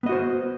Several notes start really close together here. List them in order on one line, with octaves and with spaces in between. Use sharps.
B3 D#5 F#4 C5